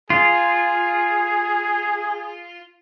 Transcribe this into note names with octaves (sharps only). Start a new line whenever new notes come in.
F4 G#4